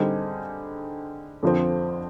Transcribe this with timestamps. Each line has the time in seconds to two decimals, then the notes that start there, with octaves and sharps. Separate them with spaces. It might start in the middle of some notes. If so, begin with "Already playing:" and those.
Already playing: D3 G3 C4 D#4 G#4
1.43 F2 D3 F3 C4